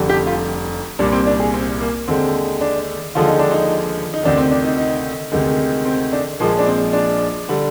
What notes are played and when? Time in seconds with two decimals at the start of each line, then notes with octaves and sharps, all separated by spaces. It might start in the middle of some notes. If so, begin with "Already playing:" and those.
Already playing: F1 F2 D3 G3
0.09 G4
0.27 F4
0.99 C2 A#2 G3 D4
1.12 C4
1.27 D4
1.40 G#4
1.54 C4
1.80 A#3
2.08 D#2 D3 G#3 C4
2.61 D4
3.15 D#2 D3 F3 G#3 F4
3.28 D#4
3.39 D4
3.51 D#4
4.14 D#4
4.23 D2 C3 D#3 D4
4.37 C4
4.51 D4
4.65 D#4
4.78 D#4
5.32 D2 C3 D#3 G#3
5.85 C4
6.13 D4
6.40 A#1 A#2 F3 G#3 A#3
6.59 D4
6.66 C4
6.93 D4
7.49 D3 G3